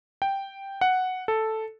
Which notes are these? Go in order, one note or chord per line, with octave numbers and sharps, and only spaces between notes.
G5
F#5
A4